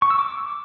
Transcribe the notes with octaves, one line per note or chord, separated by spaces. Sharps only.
C#6
E6
D6